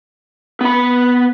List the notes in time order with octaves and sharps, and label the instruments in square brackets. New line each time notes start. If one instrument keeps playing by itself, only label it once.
[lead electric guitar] B3 B5